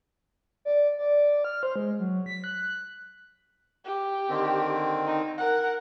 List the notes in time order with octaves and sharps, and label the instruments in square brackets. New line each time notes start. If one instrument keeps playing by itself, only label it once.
[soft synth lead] D5
D5
F6
C5
G#3
F#3
B6
F#6
[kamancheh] G4
[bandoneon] D3 D#3 C4
[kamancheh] D#4
A#4 F#5